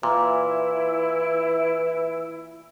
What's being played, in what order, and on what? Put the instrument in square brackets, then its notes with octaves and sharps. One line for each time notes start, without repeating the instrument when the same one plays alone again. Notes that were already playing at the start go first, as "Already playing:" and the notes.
[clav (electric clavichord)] A#2 [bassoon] E3 [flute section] E4